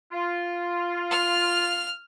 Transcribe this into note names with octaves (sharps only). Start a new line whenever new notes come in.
F4
F6